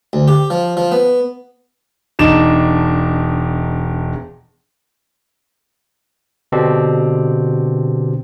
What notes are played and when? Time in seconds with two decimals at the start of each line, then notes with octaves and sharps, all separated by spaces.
0.13 D2
0.28 G4
0.50 F3
0.77 F3
0.92 B3
2.19 E1 D4 D#4 E7
6.52 B2 D3 C4 D4 G4